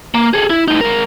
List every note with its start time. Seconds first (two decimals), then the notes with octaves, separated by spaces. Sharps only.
0.14 A#3
0.34 G#4 A4
0.50 E4
0.68 A2 D#4
0.81 G#3 A#4